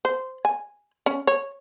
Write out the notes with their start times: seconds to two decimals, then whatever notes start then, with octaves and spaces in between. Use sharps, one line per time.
0.05 C5
0.45 G#5
1.06 C#4
1.27 C#5